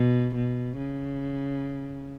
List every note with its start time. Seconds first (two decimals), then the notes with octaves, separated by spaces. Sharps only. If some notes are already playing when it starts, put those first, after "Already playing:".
Already playing: B2
0.35 B2
0.78 C#3